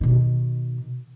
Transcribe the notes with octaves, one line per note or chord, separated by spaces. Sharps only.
B2 D#3